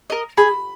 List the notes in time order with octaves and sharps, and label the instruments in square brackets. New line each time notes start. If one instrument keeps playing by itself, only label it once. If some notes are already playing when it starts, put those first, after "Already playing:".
[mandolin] A#4 D#5
[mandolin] G#4 [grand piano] B5